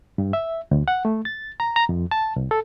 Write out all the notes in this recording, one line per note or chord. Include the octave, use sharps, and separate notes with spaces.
G2
E5
D2
F#5
A3
A6
A#5
A#5
F2
A5
C2
A4